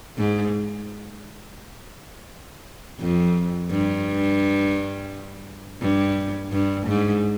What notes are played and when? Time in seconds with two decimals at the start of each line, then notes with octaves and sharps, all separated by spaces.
0.18 G#2
3.00 F2
3.70 G2
5.81 G2
6.52 G2
6.87 G#2